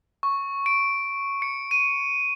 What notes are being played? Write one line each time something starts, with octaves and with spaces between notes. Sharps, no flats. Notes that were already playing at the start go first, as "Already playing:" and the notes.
C#6
D7
C#7
D#7